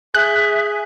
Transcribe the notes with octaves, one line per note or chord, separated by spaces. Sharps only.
G#4 E5 F#6